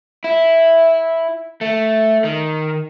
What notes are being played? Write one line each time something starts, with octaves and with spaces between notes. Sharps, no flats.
E4
A3
D#3